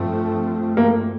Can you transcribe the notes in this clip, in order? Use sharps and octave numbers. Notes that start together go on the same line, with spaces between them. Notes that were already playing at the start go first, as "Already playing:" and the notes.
Already playing: G2 F3 A3 C4
A#3